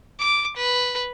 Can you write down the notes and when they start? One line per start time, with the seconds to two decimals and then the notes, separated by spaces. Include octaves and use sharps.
0.19 D6
0.57 B4